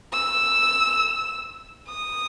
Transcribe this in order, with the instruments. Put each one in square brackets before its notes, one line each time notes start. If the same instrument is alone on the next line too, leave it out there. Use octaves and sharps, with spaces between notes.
[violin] E6
D#6